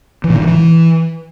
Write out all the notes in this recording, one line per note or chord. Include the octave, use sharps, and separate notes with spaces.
E3
A#2
D3
G2
E3